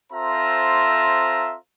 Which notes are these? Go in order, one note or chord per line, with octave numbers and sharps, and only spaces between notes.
C4 F4 A4 C5 E5 A#5